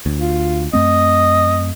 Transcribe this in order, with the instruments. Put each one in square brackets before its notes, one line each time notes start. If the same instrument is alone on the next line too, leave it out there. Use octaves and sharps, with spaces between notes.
[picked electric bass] D2
[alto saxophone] F4
[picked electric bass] F#2 A3 C4 [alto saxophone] D#5